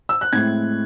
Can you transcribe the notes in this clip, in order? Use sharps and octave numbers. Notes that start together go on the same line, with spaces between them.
E6
F#6
A2 G#3 C4 E4 G#6